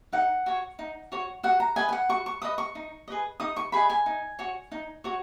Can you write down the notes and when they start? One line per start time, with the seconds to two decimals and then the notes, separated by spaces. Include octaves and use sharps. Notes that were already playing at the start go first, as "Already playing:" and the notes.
0.13 D#4 F#5
0.46 F#4 C#5
0.79 D#4
1.12 F#4 C#5
1.43 F#4 F#5
1.60 A#5
1.76 B4 D#5 G#5
1.89 G#5
1.93 F#5
2.09 F#4 C#6
2.26 C#6
2.42 B4 D#5 D#6
2.58 C#6
2.75 D#4
3.08 G#4 B4 D#5
3.40 D#4 D#6
3.56 C#6
3.72 G#4 B4 D#5 B5
3.90 G#5
4.06 D#4
4.39 F#4 C#5
4.72 D#4
5.04 F#4 C#5